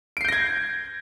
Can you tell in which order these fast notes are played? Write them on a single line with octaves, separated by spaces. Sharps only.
D7 C7 G6 A#6 G#6